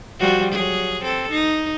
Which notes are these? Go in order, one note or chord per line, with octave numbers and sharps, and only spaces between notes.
F3 G3 F#4
F#3 G#4
C4 A4
D#4